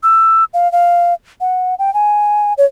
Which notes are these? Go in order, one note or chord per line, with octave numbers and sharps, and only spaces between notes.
E6
F5
F5
F#5
G5
G#5
C#5